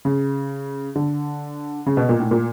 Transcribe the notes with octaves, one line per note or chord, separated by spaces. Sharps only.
C#3
D3
C#3
B2
A#2
A2
A#2